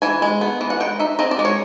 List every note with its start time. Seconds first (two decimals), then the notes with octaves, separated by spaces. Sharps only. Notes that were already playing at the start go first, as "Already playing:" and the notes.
0.02 E3 G#5
0.22 G#3
0.41 B3
0.61 E3
0.70 F#5
0.80 G#3 G5
0.99 D#4 E5
1.19 C4 D#5
1.31 D5
1.39 G#3
1.45 C#5